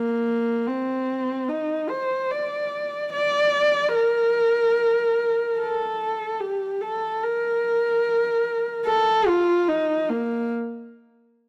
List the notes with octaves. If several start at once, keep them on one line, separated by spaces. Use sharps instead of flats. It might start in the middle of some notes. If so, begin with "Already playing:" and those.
Already playing: A#3
C4
D#4
C5
D5
D5
A#4
A4
G4
A4
A#4
A4
F4
D#4
A#3